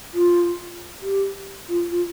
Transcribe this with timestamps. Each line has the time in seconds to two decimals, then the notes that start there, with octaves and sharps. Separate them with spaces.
0.14 F4
1.02 G4
1.69 F4
1.90 F4